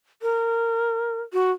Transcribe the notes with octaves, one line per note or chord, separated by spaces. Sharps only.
A#4
F#4